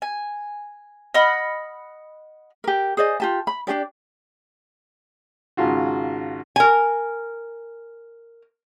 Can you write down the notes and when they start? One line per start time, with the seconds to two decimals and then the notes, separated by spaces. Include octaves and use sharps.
0.02 G#5
1.14 D#5 F#5 B5 F6
2.64 G4 A#4
2.97 G#4 C5 D5 D#5
3.20 F4 G4 A5
3.47 B5
3.67 D4 F4 G4 D5
5.57 G#1 C#3 F4 F#4
6.56 A#4 G#5